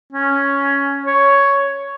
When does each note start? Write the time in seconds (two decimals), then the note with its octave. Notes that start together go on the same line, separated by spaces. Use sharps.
0.13 C#4
1.06 C#5